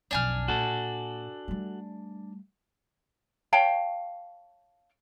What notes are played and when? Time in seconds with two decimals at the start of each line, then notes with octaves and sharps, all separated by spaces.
0.11 B1 F2 D4 G#5 F6
0.48 A#2 F#4 A4
1.48 G3 A3
3.53 C#5 F5 G5 A5